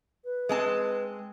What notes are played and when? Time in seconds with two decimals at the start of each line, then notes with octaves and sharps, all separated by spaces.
0.24 B4
0.49 G#3 C4 A5